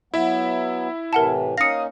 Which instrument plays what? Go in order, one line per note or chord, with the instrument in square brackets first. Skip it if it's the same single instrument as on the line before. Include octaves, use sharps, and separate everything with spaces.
[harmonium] F#3 B3 [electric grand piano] E4 E5
[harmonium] A2 C3 E3 [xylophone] A#4 F#5 A5
[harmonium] A#3 C#4 D#4 [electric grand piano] F5 D#6 [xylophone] A#6 C#7